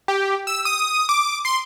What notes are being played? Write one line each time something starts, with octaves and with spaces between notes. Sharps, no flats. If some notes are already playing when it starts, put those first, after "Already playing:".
G4
E6
D#6
D6
C6